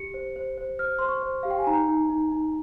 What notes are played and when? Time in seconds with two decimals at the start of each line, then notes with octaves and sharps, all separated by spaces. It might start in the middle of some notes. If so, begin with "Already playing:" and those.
Already playing: G4 C#7
0.14 C5
0.36 C5
0.58 C5
0.79 C5 F6
0.99 C5 C6
1.08 C#6
1.23 C5
1.43 G4 F5
1.51 G5
1.59 G#5
1.67 D#4 A#5
1.88 D#4
2.10 D#4
2.32 D#4